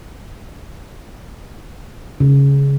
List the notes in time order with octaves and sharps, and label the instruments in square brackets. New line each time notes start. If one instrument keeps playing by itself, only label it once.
[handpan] C#3